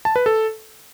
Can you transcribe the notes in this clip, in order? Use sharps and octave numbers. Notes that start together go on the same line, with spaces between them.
A5
B4
A4